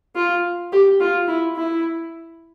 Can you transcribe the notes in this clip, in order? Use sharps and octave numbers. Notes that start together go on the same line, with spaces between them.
F4
G4
F4
E4
E4